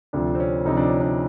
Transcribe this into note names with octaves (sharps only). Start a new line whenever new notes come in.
D2 C3 F3 D4
C4
C#4
D2 C3 F3 D#4
D4
C#4
D4